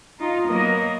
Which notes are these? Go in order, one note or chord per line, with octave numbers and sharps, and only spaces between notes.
D#4 F4
F#3 A#3 B3 A#4 D#5